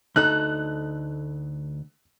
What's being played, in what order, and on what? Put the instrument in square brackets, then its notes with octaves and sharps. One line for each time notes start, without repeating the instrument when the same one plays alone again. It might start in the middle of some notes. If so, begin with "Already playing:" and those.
[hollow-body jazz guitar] D2 D#4 A4 [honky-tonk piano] F#6